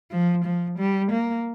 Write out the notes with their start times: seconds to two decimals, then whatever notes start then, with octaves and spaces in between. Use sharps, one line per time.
0.11 F3
0.44 F3
0.78 G3
1.11 A#3